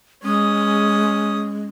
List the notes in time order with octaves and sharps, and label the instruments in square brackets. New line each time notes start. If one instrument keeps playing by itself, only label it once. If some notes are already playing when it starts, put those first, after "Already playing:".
[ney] G#3 [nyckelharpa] C#4 D#6